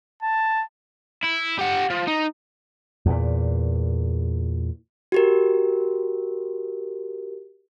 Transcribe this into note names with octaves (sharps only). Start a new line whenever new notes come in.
A5
E4
G4 F#5
F3
D#4
E2 A#2
F#4 G4 A#4